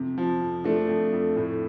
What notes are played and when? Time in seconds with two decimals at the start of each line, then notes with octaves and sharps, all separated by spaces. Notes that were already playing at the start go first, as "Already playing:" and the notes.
Already playing: F2 C3
0.18 F3
0.41 F2
0.64 F3 A3 D4
0.89 F2
1.13 F2
1.36 A2